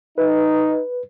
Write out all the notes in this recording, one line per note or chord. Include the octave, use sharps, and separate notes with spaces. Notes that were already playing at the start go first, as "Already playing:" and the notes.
D#4 B4